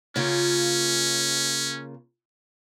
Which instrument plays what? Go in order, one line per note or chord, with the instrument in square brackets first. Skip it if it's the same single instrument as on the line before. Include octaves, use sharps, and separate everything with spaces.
[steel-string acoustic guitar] C#3 A#3 F4 [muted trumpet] C#4